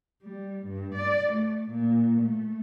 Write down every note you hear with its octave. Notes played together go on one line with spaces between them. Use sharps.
G3
G2
D5
A3
A#2
A3